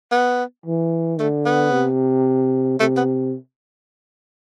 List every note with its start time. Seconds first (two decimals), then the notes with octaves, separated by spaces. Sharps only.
0.11 B3
0.66 E3
1.19 D3 A3
1.46 B3
1.72 C3
2.80 C3 A3
2.97 B3